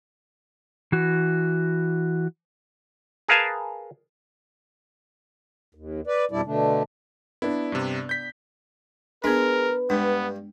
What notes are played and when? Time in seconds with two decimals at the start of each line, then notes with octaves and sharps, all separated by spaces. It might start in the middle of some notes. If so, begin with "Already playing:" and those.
0.92 E3 F#4
3.29 G#4 A#4 B4 F5 G#5 A5
5.75 D#2
6.07 B4 D5
6.31 F2 B2 G3 D4 E4 D5
6.45 B2 D3 A3 D4
7.42 B3 D4 E4
7.72 G2 C3
8.09 G6 B6
9.24 G#3 B3 D4 A#4 B4
9.90 G2 G#3 B3 D4